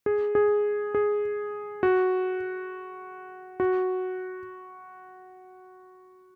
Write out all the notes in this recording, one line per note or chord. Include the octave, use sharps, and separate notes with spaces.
G#4
G#4
G#4
F#4
F#4